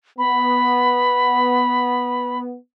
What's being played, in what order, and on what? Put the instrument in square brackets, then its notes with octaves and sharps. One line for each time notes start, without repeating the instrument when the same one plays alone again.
[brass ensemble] B3 [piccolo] B5